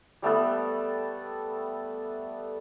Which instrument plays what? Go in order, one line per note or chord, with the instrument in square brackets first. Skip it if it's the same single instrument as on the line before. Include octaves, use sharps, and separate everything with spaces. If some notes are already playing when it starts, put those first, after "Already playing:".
[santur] G3 A3 B3 A4